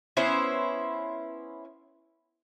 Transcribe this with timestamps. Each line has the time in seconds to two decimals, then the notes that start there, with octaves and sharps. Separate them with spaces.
0.17 B3 C#4 E4 C5